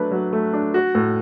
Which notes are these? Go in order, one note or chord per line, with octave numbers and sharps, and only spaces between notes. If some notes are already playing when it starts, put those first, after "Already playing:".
Already playing: F#3 A3 D4 B4
F#3
A3
D4
F#4
A2